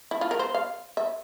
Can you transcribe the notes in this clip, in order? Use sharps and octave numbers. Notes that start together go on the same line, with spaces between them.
E4
F4
A#4
C5
F5
E5